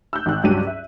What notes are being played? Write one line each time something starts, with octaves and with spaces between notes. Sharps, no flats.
E6 F#6 G6
G#1 F#6
C#2 G2 F#3 C#4 G4 D#7
E5